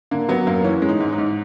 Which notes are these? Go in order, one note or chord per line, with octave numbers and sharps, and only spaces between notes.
D3 A#3
F#3 B3
F#2 A#3
E3 C#4
G#3
D#4
G#2
D#4
G#2